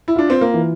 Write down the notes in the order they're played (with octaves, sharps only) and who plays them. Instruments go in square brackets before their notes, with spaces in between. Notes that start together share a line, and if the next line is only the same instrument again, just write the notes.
[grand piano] E4
[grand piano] D4 [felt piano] F4
[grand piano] C4
A#3
[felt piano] E3